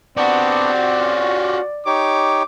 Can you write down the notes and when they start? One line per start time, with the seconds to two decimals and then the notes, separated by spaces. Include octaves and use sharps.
0.17 B3 C4 D4 F#4 G4 D5
1.00 C#4 F4 F5
1.86 D#4 G4 C#5 D6